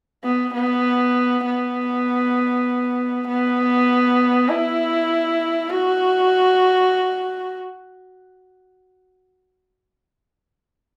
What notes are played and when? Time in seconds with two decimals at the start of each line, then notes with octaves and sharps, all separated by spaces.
0.24 B3
0.54 B3
1.45 B3
3.28 B3
4.49 E4
5.70 F#4